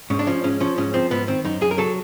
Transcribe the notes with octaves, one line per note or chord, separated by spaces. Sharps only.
G#2 C#4
D4
F3 C#4
G#2 C#4
F3 C#4
G#2 C#4
F3 C4
G#2 B3
D#3 C4
F#2 D#4
F#2 G#4
A#4
F#3 A4